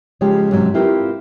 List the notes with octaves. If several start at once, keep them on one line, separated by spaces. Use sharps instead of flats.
C#3 F3 G#3 C#4 G4
G#2 C3 F#3 C#4
C4 E4 F4 G4 A#4 B4